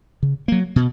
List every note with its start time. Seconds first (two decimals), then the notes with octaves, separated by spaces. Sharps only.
0.23 C#3
0.48 F#3 A#3
0.76 B2